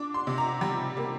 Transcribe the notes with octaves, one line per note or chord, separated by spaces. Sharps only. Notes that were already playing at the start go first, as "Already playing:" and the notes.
Already playing: D4 D6
C6
C3
A#5
G3
A#3